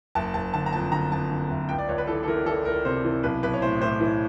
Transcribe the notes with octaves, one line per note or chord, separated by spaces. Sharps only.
F#1 A5
F#1 A5
D3 A5
A#5
F2 A5
D3 A#5
F2 A5
D3
F#1
C#2 G5
D5
C#2 C#5
B4
E3 A4
A4
E3 A#4
E3 A4
C#2 A#4
C3 C5
E3
B1 B4
B1 B4
C#5
A2 C5
A2 C5
E3